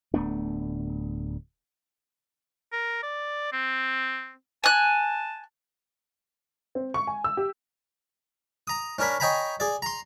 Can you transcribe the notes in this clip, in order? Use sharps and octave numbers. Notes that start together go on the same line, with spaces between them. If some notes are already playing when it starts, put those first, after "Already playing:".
D1 A3 B3 D4
A#4
D5
C4
G#5 A5 F#6
C4
C#6
G#5
E6
G4
A#5 D#6
C#4 D4 A#4 C#5 B5
C#5 D#5 G5 G#5 A#5 B5
G#4 D5
A#5 C6